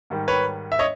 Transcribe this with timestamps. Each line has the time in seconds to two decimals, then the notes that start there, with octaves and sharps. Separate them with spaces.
0.10 G#2 D#3 G3
0.28 B4 C#5
0.72 E5
0.79 C#5 D#5